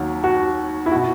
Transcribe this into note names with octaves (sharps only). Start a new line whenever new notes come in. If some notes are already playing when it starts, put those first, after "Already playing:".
Already playing: D#2 F#3
F#4
E4
B2 F#4